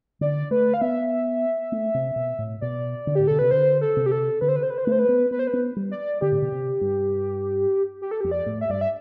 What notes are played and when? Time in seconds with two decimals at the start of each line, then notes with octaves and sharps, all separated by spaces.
0.21 D3 D5
0.51 A3 B4
0.74 F5
0.81 B3 E5
1.72 A3
1.94 C3
2.16 B2
2.39 A2
2.61 B2 D5
3.07 D3
3.15 A2 G4
3.27 B2 A4
3.39 C3 B4
3.51 D3 C5
3.81 A4
3.97 C3
4.06 G4
4.12 A4
4.41 D3 B4
4.48 C5
4.56 B4
4.63 C5
4.70 B4
4.78 C5
4.85 A3 B4
4.92 C5
4.99 B4
5.09 B3
5.31 B3 B4
5.39 C5
5.47 B4
5.53 B3
5.76 G3
5.91 D5
6.21 D3 G4
6.32 A2
6.42 B2
6.52 C3
6.81 G2
8.02 G4
8.11 A4
8.21 F2 G4
8.31 D5
8.46 A2
8.61 E5
8.69 G2 D5
8.81 E5